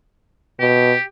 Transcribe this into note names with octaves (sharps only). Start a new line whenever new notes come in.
B2 G4